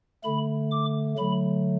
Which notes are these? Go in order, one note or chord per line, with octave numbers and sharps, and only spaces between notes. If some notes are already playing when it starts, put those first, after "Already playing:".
D3 A3 B5
D6
D3 F#3 A3 B5